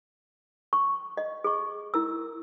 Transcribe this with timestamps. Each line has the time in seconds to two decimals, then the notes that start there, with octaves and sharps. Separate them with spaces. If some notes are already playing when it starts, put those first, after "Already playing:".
0.73 C#6
1.17 D#5
1.44 G#4 C#6
1.94 E4 A#4 E6